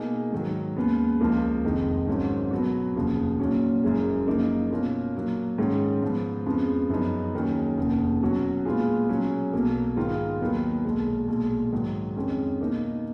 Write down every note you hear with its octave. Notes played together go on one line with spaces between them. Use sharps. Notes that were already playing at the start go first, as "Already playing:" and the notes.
Already playing: B2 A#3 D#4 G#4
G#2 D#3 F#3
D#2 C#3 G#3 B3
C#2 C#3 F3 A#3
F1 F2 D#3 G#3 D#4
G#1 G#2 F#3 C#4
B2 F#3 B3 F#4
F1 D#2 C#3 F3
A#2 F#3 C#4 F#4
F#1 F#2 C#3 G#3
F#2 C#3 F3 A#3 D#4
B2 A#3 C#4 F4
A#2 F#3 A#3
G#2 D#3 G#3 C#4
G#2 F3 B3
F2 C#3 F3 G#3 B3
F#2 C#3 F3 B3 D#4
D#2 D#3 F#3 C#4 G#4
F1 D#2 C#3
B2 F#3 C#4 F#4
A#2 G#3 B3 F4 G#4
B2 F#3 C#4 G#4
B1 B2 F#3 A#3
G#2 D#3 G#3 B3 F4
D#2 D#3 F#3 B3
B1 A#2 G#3
B1 A#2 G#3
G#2 D#3 F#3
F2 D#3 G#3 C#4
B2 A#3 D#4